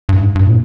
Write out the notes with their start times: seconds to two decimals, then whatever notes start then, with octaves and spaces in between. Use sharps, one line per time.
0.09 G2
0.15 G#2
0.35 G2
0.46 A#2